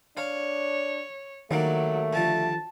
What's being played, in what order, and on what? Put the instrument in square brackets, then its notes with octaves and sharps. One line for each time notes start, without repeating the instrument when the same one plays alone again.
[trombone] D4 [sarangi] C#5 [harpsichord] F5
[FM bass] D#3 [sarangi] F#3 [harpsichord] G3 A#3 D4 [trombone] A3
[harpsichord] D3 F3 G3 [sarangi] A5